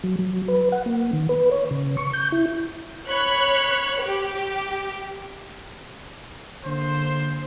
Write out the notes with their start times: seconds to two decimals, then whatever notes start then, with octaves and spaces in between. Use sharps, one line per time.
0.04 F#3
0.19 F#3
0.48 B4
0.72 F#5
0.86 A#3
1.13 D#3
1.29 B4
1.51 C#5
1.71 C#3
1.97 C#6
2.13 G6
2.32 E4
3.09 C#5 B5 F#6
4.02 G4
6.65 D3 A#3 C5